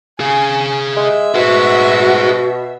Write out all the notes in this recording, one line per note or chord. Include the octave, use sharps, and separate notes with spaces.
G#4 F5 G#5
G#3 E5
B2 F#4 G#4 C5